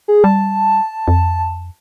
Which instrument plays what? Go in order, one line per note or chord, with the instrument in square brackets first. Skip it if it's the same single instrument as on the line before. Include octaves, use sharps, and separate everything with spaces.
[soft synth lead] G#4
[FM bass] G3 [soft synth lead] A5
[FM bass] F2